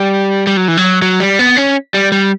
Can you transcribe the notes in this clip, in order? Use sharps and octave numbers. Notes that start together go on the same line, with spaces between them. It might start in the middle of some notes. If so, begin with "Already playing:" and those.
Already playing: G3
G3
F#3
E3
F#3
F#3
G3
B3
C#4
G3
G3